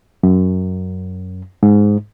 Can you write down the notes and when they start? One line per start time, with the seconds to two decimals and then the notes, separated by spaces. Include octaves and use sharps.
0.23 F#2
1.63 G#2